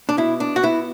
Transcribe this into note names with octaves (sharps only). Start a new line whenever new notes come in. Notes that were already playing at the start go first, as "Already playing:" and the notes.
D4
B2 E4
D4
F#4
B3 E4